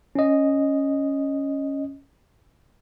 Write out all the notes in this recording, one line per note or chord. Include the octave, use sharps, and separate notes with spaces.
C#4 D#5